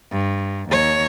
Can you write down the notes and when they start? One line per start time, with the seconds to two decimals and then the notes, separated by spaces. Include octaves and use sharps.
0.11 G2
0.69 D#2 C#5